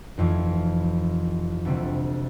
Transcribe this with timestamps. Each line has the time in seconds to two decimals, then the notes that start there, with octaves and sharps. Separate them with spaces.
0.17 F1 F2 E3
1.65 D2 C3 G3 C4